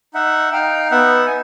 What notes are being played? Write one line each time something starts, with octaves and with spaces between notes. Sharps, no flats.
D#4 E5 F#5
D#4 F5 G5
B3 E5 F#5
G#5